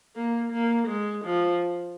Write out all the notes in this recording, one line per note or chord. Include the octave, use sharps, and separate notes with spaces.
A#3
A#3
G#3
F3